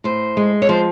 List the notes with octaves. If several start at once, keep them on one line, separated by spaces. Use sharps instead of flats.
A2 C5
G#3
C#5
F3 C5